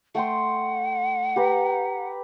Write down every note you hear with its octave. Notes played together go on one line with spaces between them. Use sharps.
A3 F#5 G5 C6
G4 B4 A#5